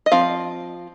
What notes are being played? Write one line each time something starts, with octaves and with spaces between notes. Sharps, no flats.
D#5
F3 C4 F5